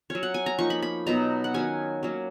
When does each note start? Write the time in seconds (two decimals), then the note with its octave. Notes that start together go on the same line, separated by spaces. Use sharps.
0.10 F#3 C#4 C#5
0.23 F#5
0.34 G#5
0.46 A#5
0.58 F3 A#3 D#4 C#6
0.70 B5
0.82 B5
1.06 B2 F#3 B3 D#4 A#5
1.44 F#5
1.54 D#3 F#3 C#4 G#5
2.03 F#3 A#3 C#4